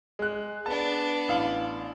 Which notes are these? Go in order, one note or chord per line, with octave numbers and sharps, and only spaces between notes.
G#3 F#6
B3 D4 A5
A1 F5 F#7